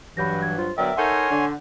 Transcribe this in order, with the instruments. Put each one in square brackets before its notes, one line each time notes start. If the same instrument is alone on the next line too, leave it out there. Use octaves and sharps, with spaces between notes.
[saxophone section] G2 F#3 [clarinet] E3 [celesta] B5 G6 A#6
[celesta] G#6
[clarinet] F4 [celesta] C5
[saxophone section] D3 F#3 B3 [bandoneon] A#4 D5 D6 [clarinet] E5 [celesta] G5
[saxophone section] D#4 A4 A#4 [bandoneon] C#5 G#5 C6 [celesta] F#5 G6
[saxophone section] D3 [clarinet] D4